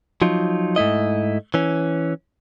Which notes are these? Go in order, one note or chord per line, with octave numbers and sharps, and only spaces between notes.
F3 F#3 D#4 F4
G#2 A3 E4 D#5
E3 C#4